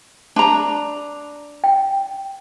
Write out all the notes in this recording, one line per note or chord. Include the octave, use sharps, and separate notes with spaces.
D4 A5 A#5 C#6
G5